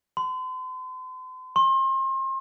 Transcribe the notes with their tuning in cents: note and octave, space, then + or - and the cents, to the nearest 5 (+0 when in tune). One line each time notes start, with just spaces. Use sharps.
C6 -40
C6 +35